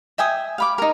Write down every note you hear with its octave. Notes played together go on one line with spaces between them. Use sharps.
E5 G5 G#5 D#6
F5 B5 D6
D#4 A#4